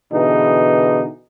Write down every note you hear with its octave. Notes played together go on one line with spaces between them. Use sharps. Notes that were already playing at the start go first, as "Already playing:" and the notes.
B2 D3 E3 D#4 G#4